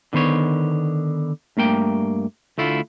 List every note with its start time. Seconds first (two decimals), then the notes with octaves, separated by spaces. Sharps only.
0.13 D3 D#3 B3 C5 C#5
1.57 G2 A3 A#3 G5
2.58 D2 A3 E4 F4